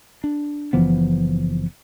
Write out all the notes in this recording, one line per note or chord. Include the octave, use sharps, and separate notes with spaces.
D4
F#1 E3 F3 B3